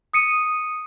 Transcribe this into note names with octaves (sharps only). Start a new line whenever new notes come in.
D#6 C#7 D#7